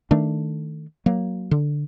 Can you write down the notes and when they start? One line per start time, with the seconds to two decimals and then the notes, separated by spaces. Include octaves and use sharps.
0.11 D#3 A3 D4
1.06 F#3 A#3
1.51 D3